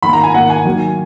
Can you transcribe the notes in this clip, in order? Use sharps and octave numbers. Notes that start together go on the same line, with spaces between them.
D#3 A#3 B5
A#5
G#5
D#3 A#3 F#5
G#5
D#3 F#3 A#3